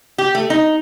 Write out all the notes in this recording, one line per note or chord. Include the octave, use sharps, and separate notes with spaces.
G4
A3
D#4